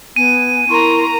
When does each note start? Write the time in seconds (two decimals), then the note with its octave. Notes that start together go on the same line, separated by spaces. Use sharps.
0.16 B3 G#5 D#7
0.69 E4 A#4 A#5 C6 C#6